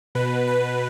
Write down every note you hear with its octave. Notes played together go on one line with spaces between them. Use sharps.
B2 B4
B4